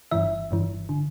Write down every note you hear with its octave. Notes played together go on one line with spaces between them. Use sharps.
G1 G2 E3 E5
G1 G2 E3
D3